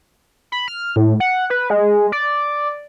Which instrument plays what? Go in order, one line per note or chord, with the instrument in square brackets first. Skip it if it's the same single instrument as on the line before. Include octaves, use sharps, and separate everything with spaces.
[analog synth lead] B5
F6
A2
F#5
B4
G#3
D5